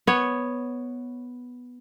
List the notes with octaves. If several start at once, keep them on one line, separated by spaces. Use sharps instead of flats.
B3 C#5